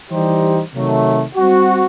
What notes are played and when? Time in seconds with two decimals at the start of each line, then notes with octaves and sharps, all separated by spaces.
0.10 E3 G3 D#4 G4 C5
0.73 C3 D#3 F#3 A3
1.35 G3 C4 F#4